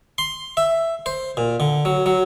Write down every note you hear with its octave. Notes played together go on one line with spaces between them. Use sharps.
C6
E5
C5
A#2
D3
F#3
F#3